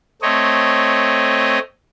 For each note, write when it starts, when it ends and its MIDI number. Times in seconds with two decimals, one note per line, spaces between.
0.22 1.59 57
0.22 1.59 60
0.22 1.59 73
0.22 1.59 75